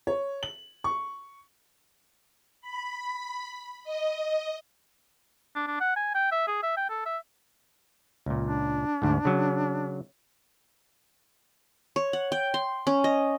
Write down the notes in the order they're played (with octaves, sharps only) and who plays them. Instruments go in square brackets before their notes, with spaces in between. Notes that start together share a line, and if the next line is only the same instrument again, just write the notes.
[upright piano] C#5
F#7
C#6
[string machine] B5
D#5
[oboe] D4
D4
F#5
G#5
G5
E5
G#4
E5
G5
A4
E5
[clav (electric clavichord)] C#2 A#2
[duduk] D4
[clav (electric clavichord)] D2 G#2
C#3 F#3
[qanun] C#5
F#5
G5
C6
C#4
D#5